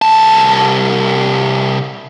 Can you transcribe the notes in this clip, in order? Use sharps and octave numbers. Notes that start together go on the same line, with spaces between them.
C2 A5